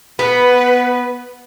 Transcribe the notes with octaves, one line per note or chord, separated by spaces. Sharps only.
B3 B4